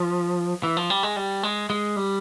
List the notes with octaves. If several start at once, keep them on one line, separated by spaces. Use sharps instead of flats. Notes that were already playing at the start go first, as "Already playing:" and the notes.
Already playing: F3
E3
F3
G3
G#3
G3
G#3
G#3
G3